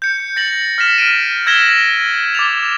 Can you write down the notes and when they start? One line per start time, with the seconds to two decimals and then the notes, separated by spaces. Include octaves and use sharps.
0.02 G6 C#7
0.36 A6 A#6 C#7 F#7
0.78 F6 A#6 B6 E7
0.98 F6 B6 D7 D#7
1.47 E6 G#6 A#6 B6 E7 G7
2.35 D6 A6 F7